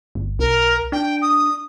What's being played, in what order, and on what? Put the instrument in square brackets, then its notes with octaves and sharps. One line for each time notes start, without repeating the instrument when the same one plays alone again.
[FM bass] G1
[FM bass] B1 [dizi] A#4
[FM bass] D4 [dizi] G5
[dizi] D#6